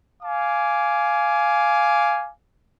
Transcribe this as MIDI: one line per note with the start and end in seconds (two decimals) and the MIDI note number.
0.23 2.29 77
0.23 2.29 80
0.23 2.29 86